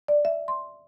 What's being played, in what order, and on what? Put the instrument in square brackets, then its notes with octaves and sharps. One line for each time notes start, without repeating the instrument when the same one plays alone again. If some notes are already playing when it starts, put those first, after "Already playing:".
[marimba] D5
E5
C6